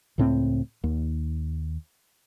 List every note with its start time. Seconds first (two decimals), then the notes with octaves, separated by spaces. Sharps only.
0.18 C#2 A2 C4
0.84 D#2